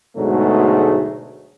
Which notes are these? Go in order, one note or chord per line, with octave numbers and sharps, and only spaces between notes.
D2 G#2 B2 F#3 G#3 A3